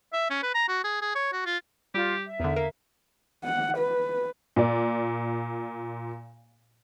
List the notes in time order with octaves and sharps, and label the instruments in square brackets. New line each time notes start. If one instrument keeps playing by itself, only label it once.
[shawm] E5
C#4
B4
A#5
F#4
G#4
G#4
C#5
F#4
F4
[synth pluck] G3 [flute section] F4 [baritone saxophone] G4
[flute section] E5
[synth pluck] E2 D3 [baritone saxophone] D#3
[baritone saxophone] A#3 [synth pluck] A#4
[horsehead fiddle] F#5
B4
[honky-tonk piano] A#2 D5